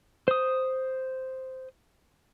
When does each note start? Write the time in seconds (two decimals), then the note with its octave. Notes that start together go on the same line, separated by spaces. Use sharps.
0.28 C5 D#6